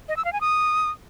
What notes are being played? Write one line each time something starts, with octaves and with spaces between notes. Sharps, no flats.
D#5
E6
F5
G#5
D#6